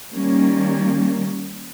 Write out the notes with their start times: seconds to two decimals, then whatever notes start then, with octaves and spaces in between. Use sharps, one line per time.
0.14 D#3 G3 A#3 C#4